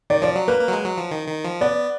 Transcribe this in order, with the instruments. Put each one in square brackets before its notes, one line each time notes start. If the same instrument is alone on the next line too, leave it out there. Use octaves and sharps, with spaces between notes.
[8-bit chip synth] D#3 [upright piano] D5
[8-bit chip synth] F3 [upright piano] D5
[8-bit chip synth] F#3
[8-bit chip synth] A#3 [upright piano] B4
[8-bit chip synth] A#3
F#3
G#3
F#3
F3
D#3
D#3
F3
[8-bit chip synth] B3 [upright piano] D5